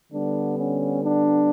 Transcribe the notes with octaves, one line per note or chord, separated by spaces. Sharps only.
D3 G3 B3 D4
C#4
D4